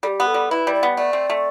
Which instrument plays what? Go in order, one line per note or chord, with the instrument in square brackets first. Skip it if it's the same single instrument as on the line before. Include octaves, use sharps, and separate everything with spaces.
[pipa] G3 [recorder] A4
[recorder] G4
[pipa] B3
[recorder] A4
[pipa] G3
[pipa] E4 [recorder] B4
[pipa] G3
[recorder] D5
[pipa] B3
[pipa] A3 [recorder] D5
[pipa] C4
A3